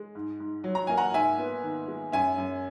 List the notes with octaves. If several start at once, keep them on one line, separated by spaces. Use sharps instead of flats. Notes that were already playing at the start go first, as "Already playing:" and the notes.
Already playing: G#3
G#2
G#2
F#3
A#5
A#3 G#5
F#5 A#5
G#2 E5 G#5
B3
D#3
G#3
F#2 E5 G#5
F#2